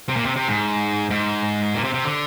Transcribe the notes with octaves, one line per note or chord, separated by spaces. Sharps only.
C3
A#2
C3
C3
G#2
G#2
A#2
C3
C3
D3